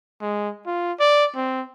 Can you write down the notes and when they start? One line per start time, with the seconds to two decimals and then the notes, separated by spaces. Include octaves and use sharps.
0.21 G#3
0.66 F4
0.99 D5
1.35 C4